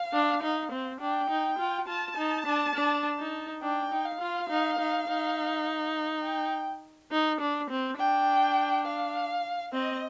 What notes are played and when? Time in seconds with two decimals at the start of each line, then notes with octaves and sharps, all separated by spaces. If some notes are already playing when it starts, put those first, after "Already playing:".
Already playing: F5
0.13 D4
0.42 D#4
0.71 C4
1.00 D4 G5
1.29 D#4
1.58 F4
1.87 F4 A5
2.17 D#4
2.46 D4
2.75 D4
3.19 D#4
3.62 D4 G5
3.91 D#4
4.05 F5
4.20 F4
4.50 D#4
4.79 D#4
5.08 D#4
6.24 G5
7.11 D#4
7.40 D4
7.70 C4
7.99 D4 G5
8.86 F5
9.73 C4 D#5